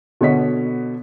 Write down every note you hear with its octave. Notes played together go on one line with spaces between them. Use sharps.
B2 D3 B3 C#5 D#5 B6